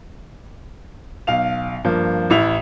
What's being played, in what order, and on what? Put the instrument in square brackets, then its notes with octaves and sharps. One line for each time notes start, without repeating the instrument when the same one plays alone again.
[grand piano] B1 F5 F7
G2 F3 A#3
A1 E4 F7